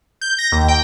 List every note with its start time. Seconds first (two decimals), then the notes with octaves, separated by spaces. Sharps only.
0.21 G6
0.38 A#6
0.52 D#2
0.68 G5